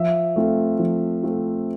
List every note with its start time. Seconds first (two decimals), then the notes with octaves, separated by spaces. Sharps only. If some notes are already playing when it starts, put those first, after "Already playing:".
Already playing: F3 E5
0.36 A3 C4 F4
0.79 F3
1.23 A3 C4 F4